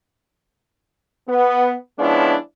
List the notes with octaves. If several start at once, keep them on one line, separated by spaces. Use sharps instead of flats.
B3
F3 G#3 B3 C#4 D4 E4